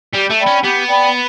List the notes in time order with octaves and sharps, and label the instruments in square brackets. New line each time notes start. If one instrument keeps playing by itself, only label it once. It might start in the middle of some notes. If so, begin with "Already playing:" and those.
[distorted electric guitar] G3 [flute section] G4
[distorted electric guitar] A3
[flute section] D5 G5 B5
[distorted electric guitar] C#4
[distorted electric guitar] B3 [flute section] G4
[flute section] D5 G5 B5